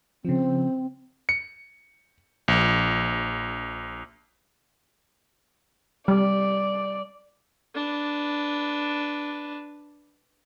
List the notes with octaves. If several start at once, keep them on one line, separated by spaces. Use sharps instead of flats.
C#3 F3 C4
C#7
A#1
G3 D5
D4 B4